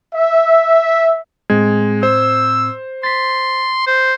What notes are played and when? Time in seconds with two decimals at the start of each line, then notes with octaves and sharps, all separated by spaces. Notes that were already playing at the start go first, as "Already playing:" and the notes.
0.15 E5
1.50 A2 G#3 C4 G#6
2.03 C5 E6
3.03 C6 A6 B6
3.87 C5